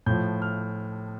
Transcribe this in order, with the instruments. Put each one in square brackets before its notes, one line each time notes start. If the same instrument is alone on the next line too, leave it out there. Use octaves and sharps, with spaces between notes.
[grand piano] A2 F3 G6
F6